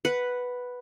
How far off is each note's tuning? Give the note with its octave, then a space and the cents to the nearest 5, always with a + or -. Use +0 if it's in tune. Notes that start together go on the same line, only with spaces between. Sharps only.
B4 +0 F#5 +0